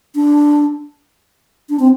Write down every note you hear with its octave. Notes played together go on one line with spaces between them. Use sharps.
D4
D4
C4